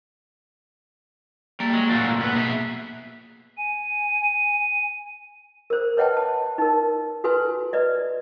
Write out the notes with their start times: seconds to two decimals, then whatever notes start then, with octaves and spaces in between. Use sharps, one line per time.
1.60 G3 A3 A#3
1.74 F#3 G#3
1.89 A#2 F#3 A3 D4 F4 F#4
2.21 B3 B4
2.35 B2 G#4 E5
3.58 G#5 D#7
5.70 A#4 C5
5.97 B4 C#5 D#5 F#5 G5 A5
6.17 A5
6.58 D#4 A#4
7.24 F#4 A4 B4 G#5 C6
7.73 B4 D5 D#5